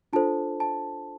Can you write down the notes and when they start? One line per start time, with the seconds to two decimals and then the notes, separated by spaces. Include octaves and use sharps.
0.13 D4 F4 A4 C5 A5
0.60 A5